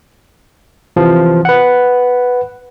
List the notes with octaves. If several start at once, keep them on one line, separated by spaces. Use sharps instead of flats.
C3 E3 F3
B4 F#5